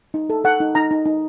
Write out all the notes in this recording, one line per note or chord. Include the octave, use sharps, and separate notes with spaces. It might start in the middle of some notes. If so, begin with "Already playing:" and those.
D#4
A4
A4 F#5
D#4
D#4 A#5
D#4
D#4